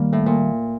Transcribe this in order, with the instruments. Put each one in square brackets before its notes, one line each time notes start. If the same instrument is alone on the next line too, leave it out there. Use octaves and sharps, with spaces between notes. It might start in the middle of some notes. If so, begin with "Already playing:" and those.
Already playing: [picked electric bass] D#3 G3 A#3
[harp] A2
A#2